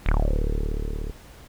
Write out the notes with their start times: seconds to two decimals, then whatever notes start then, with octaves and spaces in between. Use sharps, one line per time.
0.06 D1